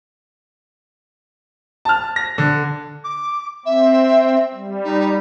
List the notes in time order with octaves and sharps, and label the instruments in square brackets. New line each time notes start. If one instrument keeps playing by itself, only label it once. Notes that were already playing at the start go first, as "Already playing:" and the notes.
[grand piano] A5 F6
A#6
D3
[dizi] D6
[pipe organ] C4 [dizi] E5
[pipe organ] G3
[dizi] D#4